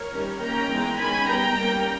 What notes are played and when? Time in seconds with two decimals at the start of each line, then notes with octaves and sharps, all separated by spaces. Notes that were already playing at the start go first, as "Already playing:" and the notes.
Already playing: A#4 C#5
0.13 D#3 G3 C#4
0.41 D#3 A#3 C#4 G5 A#5
0.70 E3 G#3 B3
0.99 D#3 G#3 C#4 G#5 B5
1.27 G3 B3 G5 A#5
1.56 G3 A#3 C#4